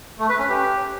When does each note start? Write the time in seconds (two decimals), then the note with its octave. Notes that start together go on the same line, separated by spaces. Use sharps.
0.19 A3
0.29 B4
0.39 C#4
0.49 G4